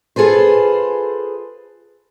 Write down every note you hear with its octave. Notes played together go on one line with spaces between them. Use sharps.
F4 G#4 A4 B4 C5